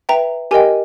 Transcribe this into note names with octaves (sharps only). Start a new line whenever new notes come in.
B4 E5 G5 A#5
G4 A#4 D#5 G5 G#5